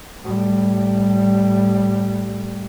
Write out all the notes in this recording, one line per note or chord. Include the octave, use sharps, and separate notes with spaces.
A2 G3